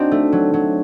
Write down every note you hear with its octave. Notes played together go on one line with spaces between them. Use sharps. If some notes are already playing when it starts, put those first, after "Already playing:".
Already playing: C4 D4 D#4 F#4
A3
F#3
F#3